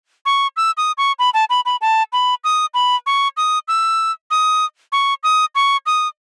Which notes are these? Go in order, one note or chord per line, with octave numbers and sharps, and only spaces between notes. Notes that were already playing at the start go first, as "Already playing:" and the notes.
C#6
E6
D#6
C#6
B5
A5
B5
B5
A5
B5
D#6
B5
C#6
D#6
E6
D#6
C#6
D#6
C#6
D#6